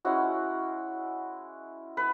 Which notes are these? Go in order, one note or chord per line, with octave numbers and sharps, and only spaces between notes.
G#3 C#4 E4 F#4
B4